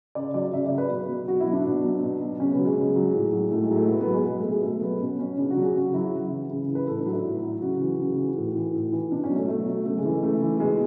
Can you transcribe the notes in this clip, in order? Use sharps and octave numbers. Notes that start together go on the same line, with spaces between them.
C#3 D5
F#3 D5
C#3 E5
D5
F#3
B4
B2
F#3
B2 F#4
E4
F#3
D4
B2
F#3
B2
F#3
C#3 C#4
B3
F#3
G#3
C#3
F#3
A2
F#3
A2 A3
G#3
F#3
A3
B2 B3
B3
F#3
G#3
B2 G#3
A3
F#3
G#3
B2 A3
F#3 B3
B2 C#4
F#3 C#4
C#3 D4
F#4
F#3
G#4
C#3 F#4
F#3 E4
C#3
E3
C#3 G#4
E3
B4
A2 A4
D4
F#3
E4
A2
F#3
C#3 F#4
E3
C#3
E3
A2
E3
A2
E3
B2 D4
C#4
F#3
A3
B2 A3
F#3
C#3 A3
G#3
E3
C#3 A3
E3
B2 G#3